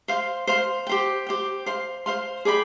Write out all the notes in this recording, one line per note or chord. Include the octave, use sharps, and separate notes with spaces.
C5 F5 C6
C5 F5 C6
G4 C5 G5
G4 C5 G5
C5 F5 C6
C5 F5 C6
G#4 D5 G5 B5